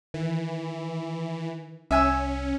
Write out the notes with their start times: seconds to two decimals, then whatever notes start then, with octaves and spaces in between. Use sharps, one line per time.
0.14 D#3 E3
1.91 C2 C#4 E5 G#5 E6